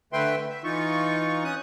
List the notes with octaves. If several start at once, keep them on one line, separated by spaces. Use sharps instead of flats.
D3 A3 B4 E5 G5 C6
E5
E3 D#4 F4 C#6
C#4 D#6 F#6